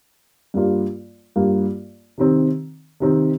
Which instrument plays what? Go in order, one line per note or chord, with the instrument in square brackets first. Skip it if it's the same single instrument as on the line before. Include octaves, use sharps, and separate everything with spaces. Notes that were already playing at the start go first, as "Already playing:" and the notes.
[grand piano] G2 G3 A#3 F4
G2 G3 A#3 F4
C3 D#3 C4
C3 D#3 C4